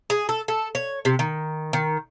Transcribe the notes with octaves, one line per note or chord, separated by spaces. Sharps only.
G#4
A4
A4
C#5
C3
D#3
D#3